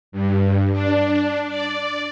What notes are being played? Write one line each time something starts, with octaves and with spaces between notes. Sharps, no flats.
G2
D4
D5